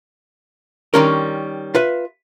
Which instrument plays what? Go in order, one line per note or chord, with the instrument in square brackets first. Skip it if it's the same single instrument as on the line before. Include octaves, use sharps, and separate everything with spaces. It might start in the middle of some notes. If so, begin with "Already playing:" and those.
[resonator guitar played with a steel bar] D#3 G3 C#4 [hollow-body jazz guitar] A#4 A#5 C6
[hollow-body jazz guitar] F4 B4 E5